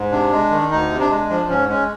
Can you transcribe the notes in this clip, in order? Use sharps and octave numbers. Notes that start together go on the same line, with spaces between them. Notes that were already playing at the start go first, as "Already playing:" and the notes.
Already playing: G#2
C3 D4
G#3
D#3
D2 D#4
C3
D4
G#3
F3 D4
G#2 C#4
G#3 C#4